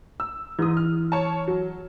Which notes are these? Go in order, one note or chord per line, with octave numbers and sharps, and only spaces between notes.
E6
G#2 E3 D#6
F6
C#5 A5
F#3